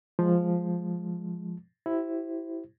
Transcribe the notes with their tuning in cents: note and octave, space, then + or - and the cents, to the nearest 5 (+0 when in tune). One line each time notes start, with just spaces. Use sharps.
F3 +0 G#3 +0
E4 +0 G4 -30 C5 +0